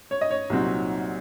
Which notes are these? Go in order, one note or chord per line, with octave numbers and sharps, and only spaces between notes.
C#5
D#5
C#5
C2 A#2 F#3 C4 D#4